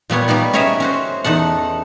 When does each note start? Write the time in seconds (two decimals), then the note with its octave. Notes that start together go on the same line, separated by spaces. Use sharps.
0.10 A#2 G3 B3 C#5
0.28 G3 A#3 B3 D#4
0.53 C#4 G#4 A#4 C#5 D#5 E5
0.80 C#4 F#4 C5
1.24 E2 D#4 A4 F#5